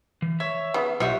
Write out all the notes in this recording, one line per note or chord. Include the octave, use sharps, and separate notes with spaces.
E3
C#5 E5
C#3 B3
B1 F4 G4 C#5 D#5 E5 F#5